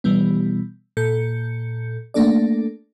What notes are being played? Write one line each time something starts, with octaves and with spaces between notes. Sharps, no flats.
B2 E3 G3 B3
A#2 A4 G6 C#7
A3 A#3 D4 A4 D5